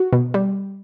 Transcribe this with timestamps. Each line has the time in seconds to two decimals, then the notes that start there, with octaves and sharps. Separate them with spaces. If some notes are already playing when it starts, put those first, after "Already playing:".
Already playing: F#4
0.13 B2
0.34 G3